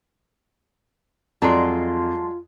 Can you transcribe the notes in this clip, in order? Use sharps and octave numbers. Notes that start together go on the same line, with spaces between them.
F2 F#3 G#3 F4 D5 A5 C6